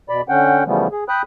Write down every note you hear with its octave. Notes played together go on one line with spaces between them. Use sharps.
B2 D5 B5
D3 C#4 F#5 G5
C#3 E3 F3 G3 A3 B3
G#4
G5 B5 D#6 F#6